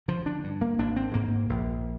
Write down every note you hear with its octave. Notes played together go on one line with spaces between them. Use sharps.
D3 F3
D4
G2
A#3
G#1 D4
C4
G#2 A#3
A#1